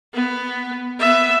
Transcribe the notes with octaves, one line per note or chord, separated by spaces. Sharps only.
B3
B3 E5